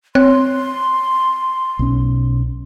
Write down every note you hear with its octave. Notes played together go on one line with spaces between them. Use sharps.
C4 C#5 C6 F#6
B1 C#4